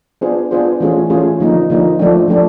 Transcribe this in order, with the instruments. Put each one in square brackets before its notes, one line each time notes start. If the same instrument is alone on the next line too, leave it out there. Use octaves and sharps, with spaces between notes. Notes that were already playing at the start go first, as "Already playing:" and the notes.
[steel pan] B3 D4 F4 G#4 C5
B3 D4 F4 G#4 C5
E3 A3 C#4 F4 G#4
E3 A3 C#4 F4 G#4
D3 F3 A#3 D#4
D3 F3 A#3 D#4
F3 A3 D4
F3 A3 D4